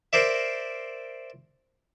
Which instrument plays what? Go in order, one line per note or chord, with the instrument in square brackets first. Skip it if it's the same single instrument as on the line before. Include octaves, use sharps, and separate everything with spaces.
[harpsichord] A#4 C5 D5 E5